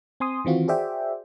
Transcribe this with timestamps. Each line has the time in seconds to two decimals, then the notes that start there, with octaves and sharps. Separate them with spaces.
0.20 C4 G#5 C6 D#6
0.45 D#3 E3 C4 F4 F#4
0.68 F#4 G#4 C5 D5 E5 G5